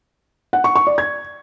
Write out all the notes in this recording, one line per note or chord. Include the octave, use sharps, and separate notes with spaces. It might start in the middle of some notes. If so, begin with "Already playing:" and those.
F#5
C#6
C#6
D5
G#6